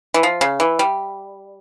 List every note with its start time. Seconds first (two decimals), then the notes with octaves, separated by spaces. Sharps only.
0.14 E3
0.23 F3
0.41 C#3
0.60 E3
0.79 G3